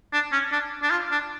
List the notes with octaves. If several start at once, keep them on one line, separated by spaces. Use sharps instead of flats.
D4
C#4
D4
D4
F4
D4